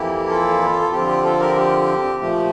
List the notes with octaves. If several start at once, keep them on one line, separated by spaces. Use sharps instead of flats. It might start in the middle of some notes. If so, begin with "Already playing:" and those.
Already playing: F2 E3 A#3 E4 G4
F4 A4
A4
D3 F3 C4 F4 G4
G4
F4 A4
G4 A#4
G4
A#2 F3 A3 G4